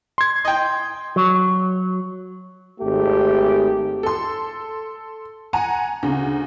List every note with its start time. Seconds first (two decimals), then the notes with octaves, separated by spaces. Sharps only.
0.18 C6 G#6
0.45 D#5 G5
1.16 F#3
2.80 G#1 A3 G4
4.03 A4 C6
5.53 F#5 G#5 A#5
6.03 D2 C#3